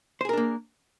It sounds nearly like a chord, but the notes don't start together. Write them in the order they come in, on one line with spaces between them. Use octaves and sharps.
C5 G#4 A#4 D4 A#3